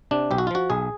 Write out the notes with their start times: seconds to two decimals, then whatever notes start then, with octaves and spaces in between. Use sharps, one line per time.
0.11 C3 D4
0.31 B1 G4
0.38 F#4
0.47 F4
0.51 F3 F#4
0.70 B1 G#4